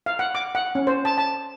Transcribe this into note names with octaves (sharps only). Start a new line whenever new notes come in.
F5
F#5
D6
F#5
C#4
C5
A5
A5